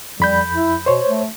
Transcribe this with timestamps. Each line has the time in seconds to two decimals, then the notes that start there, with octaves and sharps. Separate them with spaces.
0.20 F2 G3 B5 G6
0.54 E4
0.86 B2 C5 C#5
1.06 A3